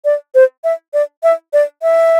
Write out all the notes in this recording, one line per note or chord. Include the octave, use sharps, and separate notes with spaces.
D5
C5
E5
D5
E5
D5
E5